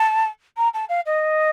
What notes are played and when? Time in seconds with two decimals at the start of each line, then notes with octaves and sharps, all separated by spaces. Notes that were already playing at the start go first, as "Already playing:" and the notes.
Already playing: A5
0.57 A#5
0.74 A5
0.89 F5
1.06 D#5